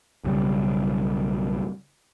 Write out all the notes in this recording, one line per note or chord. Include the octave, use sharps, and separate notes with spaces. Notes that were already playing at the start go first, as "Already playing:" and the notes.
B1 F#2 C#3 G3